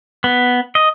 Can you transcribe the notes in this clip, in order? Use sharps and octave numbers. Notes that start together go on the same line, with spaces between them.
B3
D#5